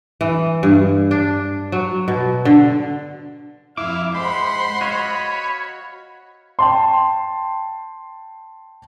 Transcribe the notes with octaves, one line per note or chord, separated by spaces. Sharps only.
E3
G2
D4
F#3
B2
D3
F2 E4 F5 D6
G#3 C5 F#5 B5 C6
F#4 C#5 D#5 F5
G5 A5 C6